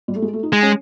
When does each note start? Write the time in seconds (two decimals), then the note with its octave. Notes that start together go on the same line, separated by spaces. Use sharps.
0.08 G3
0.16 A3
0.22 G#3
0.33 A3
0.43 D#4
0.53 G#3
0.63 C#4